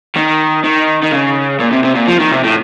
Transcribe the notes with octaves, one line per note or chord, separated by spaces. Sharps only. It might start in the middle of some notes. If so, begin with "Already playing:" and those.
D#3
D#3
D#3
C#3
A#2
C3
C3
A#2
F3
D#3
C3
A2